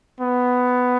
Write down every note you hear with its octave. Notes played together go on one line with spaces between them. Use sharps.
B3